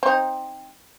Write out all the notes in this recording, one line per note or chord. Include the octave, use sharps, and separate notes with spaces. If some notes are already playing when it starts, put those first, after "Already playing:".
C4 D#4